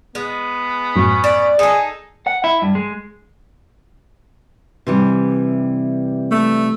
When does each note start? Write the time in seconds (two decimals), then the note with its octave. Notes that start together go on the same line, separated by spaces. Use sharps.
0.15 G#3 B3
0.96 F#2 A2 F#3 C#4
1.24 D5
1.59 D#4 G#4 A4
2.27 F#5
2.44 E4
2.62 G2
2.75 G#3
4.87 C3 E3 G3
6.31 A3